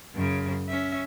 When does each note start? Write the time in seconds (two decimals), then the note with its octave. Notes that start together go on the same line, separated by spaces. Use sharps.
0.15 F#2 C#3
0.68 C#4 E5